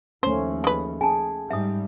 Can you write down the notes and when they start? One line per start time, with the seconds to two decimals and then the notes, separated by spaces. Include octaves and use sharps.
0.23 D#2 F3 A3 C#4 C5
0.64 G#3 B4
1.01 G#4 G#5 A5
1.50 G#2 G3 E5 D#6